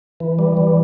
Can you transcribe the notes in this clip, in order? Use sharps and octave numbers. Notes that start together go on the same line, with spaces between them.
E3
G3
E3